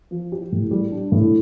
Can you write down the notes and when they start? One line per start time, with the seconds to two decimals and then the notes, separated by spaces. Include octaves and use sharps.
0.11 F3
0.32 G4
0.52 A2
0.71 G3
0.92 D4
1.12 A2